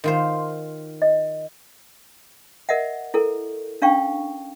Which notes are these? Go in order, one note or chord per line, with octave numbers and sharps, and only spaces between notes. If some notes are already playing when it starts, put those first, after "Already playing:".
D#3 F4 C5
D#5
A#4 D#5 E5 F#5
E4 A4 A#4
C#4 D4 F5 G5 C#6